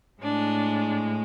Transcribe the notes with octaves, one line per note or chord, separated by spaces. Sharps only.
A2 G#3 D4